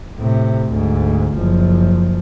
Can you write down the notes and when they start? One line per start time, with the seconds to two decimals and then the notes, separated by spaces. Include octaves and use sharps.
0.17 A2 C3
0.71 D2 G#2
1.36 F#1 F3